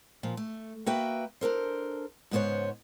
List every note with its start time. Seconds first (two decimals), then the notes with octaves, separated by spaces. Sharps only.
0.23 A#2 F3
0.37 A3
0.86 A#3 F#4 B4 E5 G5
1.41 D4 A4 A#4 C5
2.31 G#2 C#3 B3 F4 C5 C#5